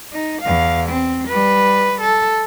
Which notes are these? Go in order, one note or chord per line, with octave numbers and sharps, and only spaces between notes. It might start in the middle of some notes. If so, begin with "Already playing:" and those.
D#4
E2 F5
C4
G3 B4
A4